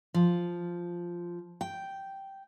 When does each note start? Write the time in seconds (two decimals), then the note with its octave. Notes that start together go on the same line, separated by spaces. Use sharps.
0.14 F3
1.61 G5